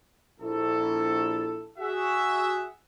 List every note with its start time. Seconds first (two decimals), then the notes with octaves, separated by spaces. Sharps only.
0.40 A#1 E4 A4
1.79 F#4 G#4 E5 F#5